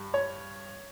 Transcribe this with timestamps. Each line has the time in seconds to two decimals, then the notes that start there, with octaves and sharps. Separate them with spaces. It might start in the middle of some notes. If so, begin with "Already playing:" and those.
Already playing: G2
0.14 C#5